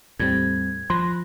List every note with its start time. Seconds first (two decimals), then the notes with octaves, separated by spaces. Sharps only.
0.20 E2 A2 G3 C4 G#6
0.90 F3 B5 C6 F#6 A#6